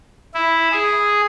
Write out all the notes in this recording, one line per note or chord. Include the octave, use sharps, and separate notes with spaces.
E4
G#4